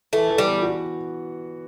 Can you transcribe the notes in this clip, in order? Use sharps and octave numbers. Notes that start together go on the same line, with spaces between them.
E3 A3
E3
G3
B3
F#4